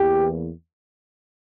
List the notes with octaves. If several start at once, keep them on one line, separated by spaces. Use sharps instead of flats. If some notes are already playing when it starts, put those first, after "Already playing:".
Already playing: E2 E3 A#3 G4